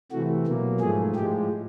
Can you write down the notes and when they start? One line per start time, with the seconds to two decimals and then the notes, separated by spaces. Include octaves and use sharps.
0.12 C3 E3 A3 F#4
0.47 B2 F#3 A#3
0.80 G#2 F3 A3 G#4
1.15 A2 F3 G#3 G4